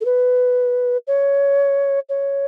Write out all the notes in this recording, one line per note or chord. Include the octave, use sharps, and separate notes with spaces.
A4
B4
C#5
C#5